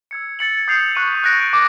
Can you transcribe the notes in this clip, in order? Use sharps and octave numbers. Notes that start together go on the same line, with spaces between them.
E6 G#6 C#7
A6 C#7 F#7
D#6 G6 C7 F7
C#6 F#6 B6 D#7
F#6 A#6 D7
D6